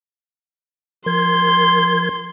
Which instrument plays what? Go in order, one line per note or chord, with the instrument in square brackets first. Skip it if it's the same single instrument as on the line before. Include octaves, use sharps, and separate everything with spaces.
[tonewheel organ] F3 A#4 G#6 [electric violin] C6